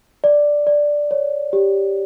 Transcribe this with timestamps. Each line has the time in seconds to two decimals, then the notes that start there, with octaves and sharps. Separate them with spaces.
0.24 D5
0.67 D5
1.11 C#5
1.53 G4